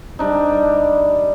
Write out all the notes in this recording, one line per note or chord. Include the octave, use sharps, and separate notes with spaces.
G3 D4 D#4